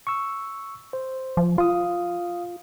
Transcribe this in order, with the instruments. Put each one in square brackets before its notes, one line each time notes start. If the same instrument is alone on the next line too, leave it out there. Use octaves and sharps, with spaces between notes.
[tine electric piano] C#6 E6
C5
[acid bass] F3
[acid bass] F4 [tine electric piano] F5 D#6